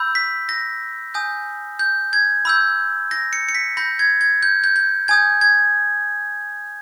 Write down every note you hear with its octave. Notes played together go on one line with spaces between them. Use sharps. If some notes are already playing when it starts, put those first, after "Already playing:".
Already playing: B5 E6 G6
B6
A#6
G#5 D#6 G6
G6
G#6
B5 E6 G6
A#6
C#7
C#7
B6
B5 G6 A#6
G#6
G#6
G6
G6
G6
G#5 D#6 G6 G#6
G#6